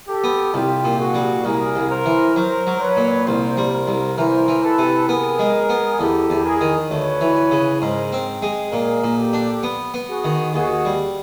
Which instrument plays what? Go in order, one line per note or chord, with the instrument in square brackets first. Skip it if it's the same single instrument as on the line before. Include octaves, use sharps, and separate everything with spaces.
[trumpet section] G4 A4
[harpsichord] B3
[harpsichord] C2 [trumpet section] F4 G4
[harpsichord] A#2
[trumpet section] F#4 G#4
[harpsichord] G3
[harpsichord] C2 [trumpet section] G#4 A#4
[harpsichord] C2
[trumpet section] A#4 C5
[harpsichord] E3
[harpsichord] F#3 [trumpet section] A#4 C5
[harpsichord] F#3
[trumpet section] B4 C#5
[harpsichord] A#2
[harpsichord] C2 [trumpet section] A#4 C5
[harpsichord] G3
[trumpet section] A#4 C5
[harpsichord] C2
[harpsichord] E3 [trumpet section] A#4 C5
[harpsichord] E3
[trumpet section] A4 B4
[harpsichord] C3
[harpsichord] B3 [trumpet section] G#4 A#4
[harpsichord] G#3
B3
[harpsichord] E2 [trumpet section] G4 A4
[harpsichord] E2
[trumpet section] G#4 A#4
[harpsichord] D#3
[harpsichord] D2 [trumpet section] B4 C#5
[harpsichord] E3
C#3
[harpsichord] G#2 [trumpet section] A#4 C5
[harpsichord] C4
G#3
[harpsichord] A#2 [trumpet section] G#4 A#4
[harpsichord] A#2
[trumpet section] G4 A4
[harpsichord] D4
B3
B3
[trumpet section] F#4 G#4
[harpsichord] D#3
[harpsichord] D#2 [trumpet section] F#4 G#4
[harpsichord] G3